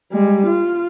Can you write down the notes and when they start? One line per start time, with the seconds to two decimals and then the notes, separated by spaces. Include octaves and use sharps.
0.12 G3 G#3
0.47 F4